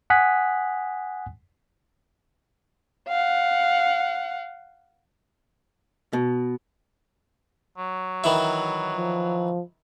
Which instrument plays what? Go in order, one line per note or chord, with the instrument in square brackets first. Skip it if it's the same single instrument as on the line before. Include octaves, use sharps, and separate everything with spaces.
[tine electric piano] F#5 G#5 D#6 F#6 B6
[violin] F5 F#5
[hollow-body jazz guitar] B2
[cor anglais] F#3
[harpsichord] D#3 E3 E5
[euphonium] F3